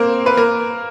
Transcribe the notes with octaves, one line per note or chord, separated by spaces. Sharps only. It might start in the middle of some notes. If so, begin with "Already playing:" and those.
Already playing: A#3 C4 A#4 C5
B4
A#3 A#4